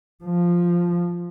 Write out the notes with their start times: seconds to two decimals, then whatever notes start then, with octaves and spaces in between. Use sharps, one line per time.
0.25 F3